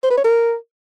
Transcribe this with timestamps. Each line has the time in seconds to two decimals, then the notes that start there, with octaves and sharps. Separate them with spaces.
0.03 C5
0.10 B4
0.17 C#5
0.24 A#4